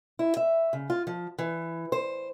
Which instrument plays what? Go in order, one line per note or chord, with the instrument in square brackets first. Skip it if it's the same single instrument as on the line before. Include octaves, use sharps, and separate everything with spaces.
[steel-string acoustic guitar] E4
E5
C#3
F4
F3
E3
C5